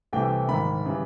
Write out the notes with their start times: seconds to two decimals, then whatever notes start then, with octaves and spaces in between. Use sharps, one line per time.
0.13 C2 C3 E3 A3 G5
0.48 A#1 G#2 D#3 B5
0.85 C#3 E3 G3